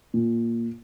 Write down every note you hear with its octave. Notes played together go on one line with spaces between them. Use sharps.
A#2